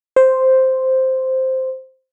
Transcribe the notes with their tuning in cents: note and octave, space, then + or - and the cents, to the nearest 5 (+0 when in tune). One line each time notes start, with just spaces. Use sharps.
C5 +0